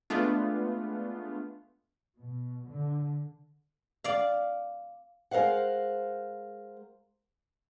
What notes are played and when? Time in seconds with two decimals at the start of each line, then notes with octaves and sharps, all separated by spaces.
0.10 G#3 A3 B3 D4 F4
2.18 B2
2.68 D3
4.04 D5 F5
5.31 G#3 A#4 C5 F5 F#5